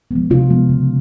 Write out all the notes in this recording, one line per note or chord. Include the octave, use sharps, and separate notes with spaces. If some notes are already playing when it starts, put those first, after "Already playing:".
F3 G#3 B3
C3 F4
F3 G#3 B3
C#3